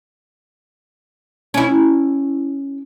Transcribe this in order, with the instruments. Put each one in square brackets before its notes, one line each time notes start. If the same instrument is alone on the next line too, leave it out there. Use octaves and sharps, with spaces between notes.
[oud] C#4 E4